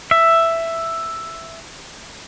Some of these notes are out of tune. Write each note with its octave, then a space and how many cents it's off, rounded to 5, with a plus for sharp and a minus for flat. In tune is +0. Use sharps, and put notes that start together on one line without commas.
E5 +5